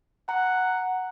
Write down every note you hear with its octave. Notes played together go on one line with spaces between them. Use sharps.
F#5 A#5